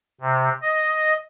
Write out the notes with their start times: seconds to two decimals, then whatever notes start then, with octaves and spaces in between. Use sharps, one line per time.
0.21 C3
0.62 D#5